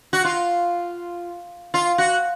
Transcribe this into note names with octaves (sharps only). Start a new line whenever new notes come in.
F#4
F4
F4
F#4